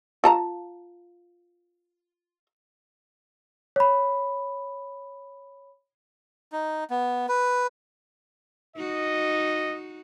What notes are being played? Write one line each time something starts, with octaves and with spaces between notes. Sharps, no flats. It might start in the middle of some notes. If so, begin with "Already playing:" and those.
F4 A5 A#5
C#5 B5
D#4
B3
B4
D#4 F#4 D#5